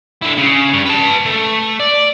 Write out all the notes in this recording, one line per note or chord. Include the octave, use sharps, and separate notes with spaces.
D3 E4
C#3
G2
B4 A5
A3
D5